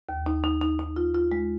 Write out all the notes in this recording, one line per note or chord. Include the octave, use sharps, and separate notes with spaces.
D#2
D#4
D#4
D#4
D#4
F4
F4
G#3